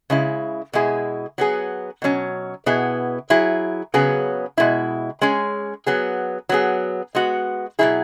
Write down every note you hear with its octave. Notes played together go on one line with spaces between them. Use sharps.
C#3 G#3 E4
B2 G#3 E4 G#4
F#3 B3 G#4
B2 F#3 C#4
B2 B3 E4 G#4
F#3 E4 G#4
C#3 F#3 B3 G#4
B2 G#3 E4
G#3 C#4 G#4
F#3 B3 G#4
F#3 B3 G#4
G#3 B3 F#4
B2 F#3 E4 G#4